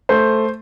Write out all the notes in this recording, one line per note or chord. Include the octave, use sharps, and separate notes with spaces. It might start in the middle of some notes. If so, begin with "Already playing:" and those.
A3 C5